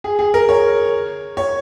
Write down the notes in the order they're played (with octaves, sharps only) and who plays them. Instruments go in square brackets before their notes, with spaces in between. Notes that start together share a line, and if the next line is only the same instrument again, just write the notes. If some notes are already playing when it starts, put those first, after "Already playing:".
[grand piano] G#4
G#4
A#4
C#5
C#5